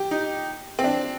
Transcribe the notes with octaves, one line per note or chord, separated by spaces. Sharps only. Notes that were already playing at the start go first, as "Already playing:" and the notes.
Already playing: G4
D#4
C4
D4